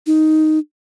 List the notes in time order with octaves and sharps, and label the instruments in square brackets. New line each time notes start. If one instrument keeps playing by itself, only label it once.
[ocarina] D#4